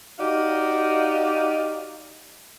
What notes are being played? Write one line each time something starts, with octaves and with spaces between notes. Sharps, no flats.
D#4 F#4 G4 D5 D#5 F5